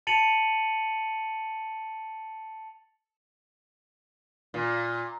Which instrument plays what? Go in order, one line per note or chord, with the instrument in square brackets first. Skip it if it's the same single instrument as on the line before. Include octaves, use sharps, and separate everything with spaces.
[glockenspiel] A5 A6 C#7 D#7 F7 F#7
[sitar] A#2